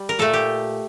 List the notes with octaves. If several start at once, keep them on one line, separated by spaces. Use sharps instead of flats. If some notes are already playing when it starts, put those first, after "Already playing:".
Already playing: G3
A#4
A#2 A3 A4
G4